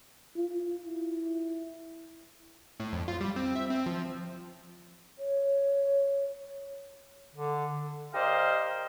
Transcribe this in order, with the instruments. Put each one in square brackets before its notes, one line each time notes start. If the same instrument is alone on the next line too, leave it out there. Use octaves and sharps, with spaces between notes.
[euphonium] F4
E4
[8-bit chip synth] A2
F2
F4
G3
C4
E5
C4
F3
[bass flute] C#5
[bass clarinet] D3
[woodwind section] G4 A#4 C5 D5 D#5 F5